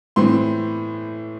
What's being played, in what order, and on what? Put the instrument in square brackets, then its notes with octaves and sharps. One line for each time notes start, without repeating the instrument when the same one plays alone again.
[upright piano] A2 E3 C4 C6